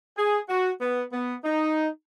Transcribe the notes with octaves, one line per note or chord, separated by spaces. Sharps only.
G#4
F#4
B3
B3
D#4